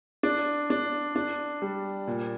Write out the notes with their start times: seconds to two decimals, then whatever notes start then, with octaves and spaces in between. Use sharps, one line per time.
0.23 D4
0.70 D4
1.16 D4
1.62 G3
2.07 A#2